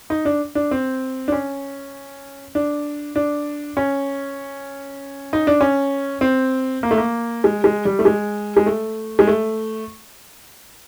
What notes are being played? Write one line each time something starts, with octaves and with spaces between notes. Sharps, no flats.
D#4
D4
D4
C4
D4
C#4
D4
D4
C#4
D#4
D4
C#4
C4
A#3
A3
A#3
G#3
G#3
G3
A3
G#3
G#3
A3
G#3
A3